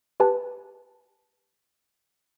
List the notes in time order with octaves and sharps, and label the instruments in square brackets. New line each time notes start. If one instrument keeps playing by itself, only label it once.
[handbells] G4 B4 G#5 A5